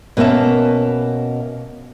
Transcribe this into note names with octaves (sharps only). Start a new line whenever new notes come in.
B2 A#3 C#4 E5 A5